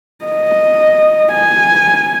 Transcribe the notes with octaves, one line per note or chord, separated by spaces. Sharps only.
D#5
G#5